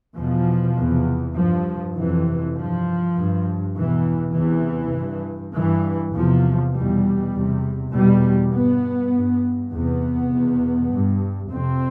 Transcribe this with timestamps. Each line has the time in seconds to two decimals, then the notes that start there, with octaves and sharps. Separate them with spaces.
0.17 E2 B2 F3
0.77 E2 C3
1.37 G2 F3
1.96 F2 C3 E3
2.56 G2 F3
3.16 G2
3.75 E2 B2 E3
4.35 E2 C3 E3
4.95 G2
5.55 G2 E3
6.14 E2 C3 F3
6.74 E2 B2 G3
7.34 E2 C3
7.93 E2 B2 G3
8.53 G2 B3
9.13 G2
9.72 E2 C3 B3
10.32 E2 B2
10.92 G2
11.51 F2 C3 C4